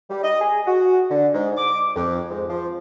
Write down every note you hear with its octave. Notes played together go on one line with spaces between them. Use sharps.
G3
D#5
G#4
F#4
D3
G#2
D6
F2
G#2
F3